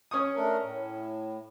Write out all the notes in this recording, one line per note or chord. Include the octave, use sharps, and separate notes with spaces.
C#4 C#6 D#6
A3 D4 A#4
A2